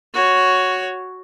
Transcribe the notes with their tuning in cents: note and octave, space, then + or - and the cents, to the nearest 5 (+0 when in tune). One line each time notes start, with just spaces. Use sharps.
F#4 +0 C#5 +5